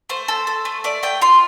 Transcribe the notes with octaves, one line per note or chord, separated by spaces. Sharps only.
A3 C5
A4
A4
A3
A3 D5
A3 G5
F4 C6